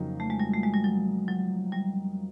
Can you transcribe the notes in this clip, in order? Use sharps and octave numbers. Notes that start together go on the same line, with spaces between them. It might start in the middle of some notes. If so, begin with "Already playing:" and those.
Already playing: F2 C#3 F#3 A#3 D#4
A3
G#3
G3
A3
G#3
G3
F#3
F#3
G3